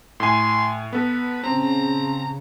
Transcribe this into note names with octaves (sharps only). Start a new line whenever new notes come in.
A2 G#5 C6
B3 A4 B4
C#3 C4 A#5